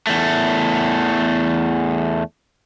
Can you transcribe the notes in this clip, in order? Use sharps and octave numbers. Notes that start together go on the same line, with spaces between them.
E2 A3